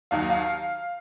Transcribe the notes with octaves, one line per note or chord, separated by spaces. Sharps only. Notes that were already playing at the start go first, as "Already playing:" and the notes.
D#2 D#3 F#3 F5
F5